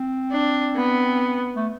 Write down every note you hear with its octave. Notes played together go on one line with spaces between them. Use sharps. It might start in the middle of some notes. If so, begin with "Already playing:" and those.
Already playing: C4
D4
B3
A3